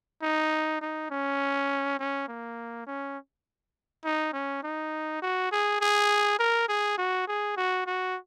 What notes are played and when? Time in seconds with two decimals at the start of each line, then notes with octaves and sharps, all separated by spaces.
0.22 D#4
0.81 D#4
1.11 C#4
1.99 C#4
2.28 A#3
2.87 C#4
4.05 D#4
4.33 C#4
4.63 D#4
5.22 F#4
5.52 G#4
5.81 G#4
6.39 A#4
6.69 G#4
6.98 F#4
7.27 G#4
7.57 F#4
7.86 F#4